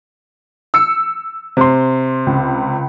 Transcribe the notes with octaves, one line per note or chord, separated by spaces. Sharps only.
E6 C#7
C3 C6
C#2